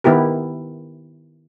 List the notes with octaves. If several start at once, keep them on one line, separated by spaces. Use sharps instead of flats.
D#3 B3 E4 G4 A#4